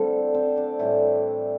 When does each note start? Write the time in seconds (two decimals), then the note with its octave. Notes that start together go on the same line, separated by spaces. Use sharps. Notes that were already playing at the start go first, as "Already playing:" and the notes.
Already playing: D3 G3 A3 C4 E4 A4 C5 E5
0.34 C4 C5
0.56 D4 D5
0.79 A2 E3 G3 E4 E5